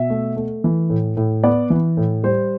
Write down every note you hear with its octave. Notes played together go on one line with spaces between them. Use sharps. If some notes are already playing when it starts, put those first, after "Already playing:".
Already playing: B2 E5
A3
A3
E3
A2
A2
B3 D5
E3
A2
G3 C5